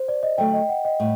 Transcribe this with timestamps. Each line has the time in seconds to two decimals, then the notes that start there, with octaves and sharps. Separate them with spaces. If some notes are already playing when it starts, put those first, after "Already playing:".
Already playing: C5
0.08 D5
0.23 D#5
0.38 D3 F#3 A3 G5
0.53 D#5
0.69 F#5
0.85 D#5
1.00 A2 G3